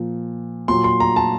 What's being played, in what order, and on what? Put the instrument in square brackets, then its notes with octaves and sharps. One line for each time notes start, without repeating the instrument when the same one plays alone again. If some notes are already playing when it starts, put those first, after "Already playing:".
Already playing: [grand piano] A#2 F3
A#2 F#3 C6
C6
A#5
A5